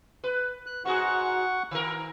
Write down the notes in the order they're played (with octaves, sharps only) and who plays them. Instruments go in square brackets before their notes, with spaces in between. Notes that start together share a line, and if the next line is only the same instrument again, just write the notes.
[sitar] B4
[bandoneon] F#6
[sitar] G#2 F#4 G#4 [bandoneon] F#5 C#6
[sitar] D#3 A#4